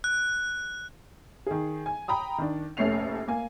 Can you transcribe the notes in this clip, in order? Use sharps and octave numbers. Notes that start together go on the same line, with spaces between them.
F#6
D#3 G#4
G#5
G5 A#5 B5 D#6
D#3 D4
F1 A#1 A3 C#4 C7 F7
A#3 G#5